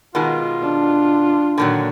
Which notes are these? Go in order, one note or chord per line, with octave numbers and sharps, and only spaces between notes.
B2 D#3 G#3 F4
D4
A#2 D3 D#3 F#3